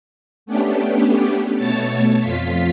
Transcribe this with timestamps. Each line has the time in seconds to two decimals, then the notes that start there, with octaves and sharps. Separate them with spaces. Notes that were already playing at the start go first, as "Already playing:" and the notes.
0.46 A3 B3 C#4 D4 G4
1.57 B2 A3 C#5 A5 A6
2.20 F2 F4 B6